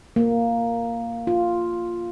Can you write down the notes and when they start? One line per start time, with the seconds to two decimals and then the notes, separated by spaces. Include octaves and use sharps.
0.16 A#3
1.27 F4